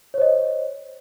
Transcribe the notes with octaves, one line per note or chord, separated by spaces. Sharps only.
C5 C#5 D#5